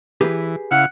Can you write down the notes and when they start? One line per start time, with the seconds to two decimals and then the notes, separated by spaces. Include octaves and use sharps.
0.21 E3 G4 G#4 B4
0.71 C#3 E4 F5 F#5